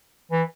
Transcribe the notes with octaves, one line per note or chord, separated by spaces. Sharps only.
E3